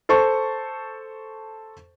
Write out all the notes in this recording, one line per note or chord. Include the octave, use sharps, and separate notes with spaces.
A4 C5 A5 C#6